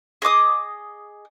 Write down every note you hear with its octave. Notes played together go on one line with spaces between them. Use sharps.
G#4 D#5 D6 D#6